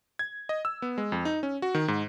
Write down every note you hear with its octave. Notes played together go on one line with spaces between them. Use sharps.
G#6
D#5
E6
B3
G#3
F2
D#4
C#4
F#4
D#3
G#2